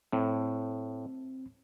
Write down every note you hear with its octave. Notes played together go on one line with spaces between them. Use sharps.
A2 C4